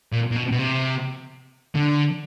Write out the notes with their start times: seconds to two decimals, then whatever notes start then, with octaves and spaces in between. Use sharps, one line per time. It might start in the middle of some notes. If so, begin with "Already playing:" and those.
0.12 A#2
0.31 A#2
0.36 B2
0.51 B2
0.59 C3
1.75 D3